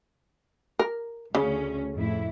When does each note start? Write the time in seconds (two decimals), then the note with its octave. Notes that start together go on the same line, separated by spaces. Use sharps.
0.79 A#4
1.35 D2 C#3 C#4
1.95 F2 A2 E4